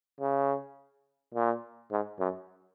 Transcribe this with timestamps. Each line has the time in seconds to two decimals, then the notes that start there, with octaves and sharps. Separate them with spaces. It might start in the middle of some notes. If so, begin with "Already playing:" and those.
0.20 C#3
1.34 A#2
1.91 G#2
2.20 F#2